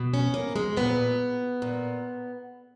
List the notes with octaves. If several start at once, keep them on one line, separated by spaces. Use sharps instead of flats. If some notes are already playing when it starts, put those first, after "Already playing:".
Already playing: B2
C#4
A#3
G#3
A#2 B3
A#2